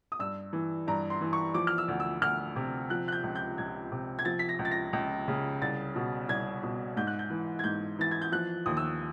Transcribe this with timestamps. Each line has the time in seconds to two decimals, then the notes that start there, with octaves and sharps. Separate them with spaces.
0.12 D#6
0.19 G2 E6
0.53 E3
0.88 G2 A#5
1.10 C6
1.21 E3
1.33 C#6
1.54 F3 D6
1.67 F6
1.78 E6
1.88 D2
2.00 E6
2.22 D2 F6
2.56 C3
2.90 F3 F#6
3.08 F#6
3.12 G6
3.24 C#2
3.35 G6
3.58 C#2 G#6
3.92 C3
4.19 G#6
4.25 F3 A6
4.39 B6
4.49 A#6
4.59 C#2
4.65 A6
4.71 A#6
4.93 C#2
5.28 C#3
5.61 C2 A6
5.95 B2
6.28 C2 G#6
6.63 B2
6.97 G#2 G6
7.07 F#6
7.19 G6
7.30 E3
7.59 G#6
7.64 G#2 G6
7.99 E3 A6
8.11 G#6
8.22 G6
8.32 F3 F#6
8.66 D#2 D#6
8.77 E6